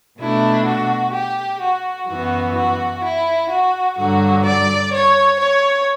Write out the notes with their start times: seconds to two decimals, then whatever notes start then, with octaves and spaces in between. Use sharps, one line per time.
0.18 B2 A3 D4 E4
0.66 F#4
1.13 G4
1.60 F#4
2.08 F#2 E3 B3 F#4
2.55 F#4
3.03 E4
3.50 F#4
3.97 G2 D3 F#3 F#4
4.45 D5
4.92 C#5
5.40 C#5